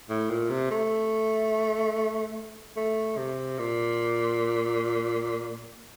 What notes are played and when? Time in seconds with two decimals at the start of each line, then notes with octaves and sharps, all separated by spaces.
0.09 A2
0.30 A#2
0.50 C3
0.71 A3
2.76 A3
3.18 C3
3.59 A#2